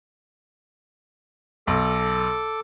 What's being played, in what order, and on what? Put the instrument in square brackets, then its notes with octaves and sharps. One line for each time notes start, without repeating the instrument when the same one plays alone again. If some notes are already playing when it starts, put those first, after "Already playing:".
[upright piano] B1 [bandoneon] A4 D6